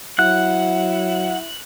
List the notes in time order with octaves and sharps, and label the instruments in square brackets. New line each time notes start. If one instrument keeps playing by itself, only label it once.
[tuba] F#3 [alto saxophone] E4 [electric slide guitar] F#5 [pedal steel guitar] F#6